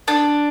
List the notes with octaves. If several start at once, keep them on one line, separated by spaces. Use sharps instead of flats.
D4